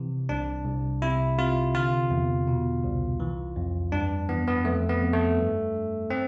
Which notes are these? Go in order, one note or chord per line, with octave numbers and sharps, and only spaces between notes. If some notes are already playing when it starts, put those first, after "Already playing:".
Already playing: C3 E3
C2 D4
C2
C3 E4
C3 F4
D3 F4
E2
B2
C2
E3
F2
G2 D4
E3 B3
B3
F2 A3
B3
F2
A3
G2
G2
C4